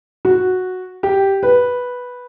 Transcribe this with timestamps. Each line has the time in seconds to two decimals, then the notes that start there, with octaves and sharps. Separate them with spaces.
0.25 F#4
1.03 G4
1.43 B4